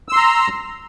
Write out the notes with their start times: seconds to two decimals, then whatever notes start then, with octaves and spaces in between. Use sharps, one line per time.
0.09 E6
0.12 C6
0.16 A#5